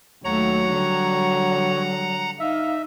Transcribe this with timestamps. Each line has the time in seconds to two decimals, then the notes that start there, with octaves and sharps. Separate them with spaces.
0.25 D#2 F#3 A3 C#5 F#5 A#5
0.72 D3 G3
2.40 D#4 E5 F5